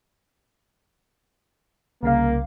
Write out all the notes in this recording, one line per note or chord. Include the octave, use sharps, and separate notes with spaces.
C2 C#3 A#3 F5